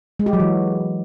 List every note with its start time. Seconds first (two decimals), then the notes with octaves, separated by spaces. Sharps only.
0.20 G#3
0.26 G4
0.33 F#3
0.40 E3